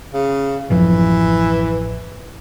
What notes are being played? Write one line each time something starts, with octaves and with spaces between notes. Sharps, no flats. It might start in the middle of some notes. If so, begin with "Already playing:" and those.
C#3
A1 F#2 E3 F3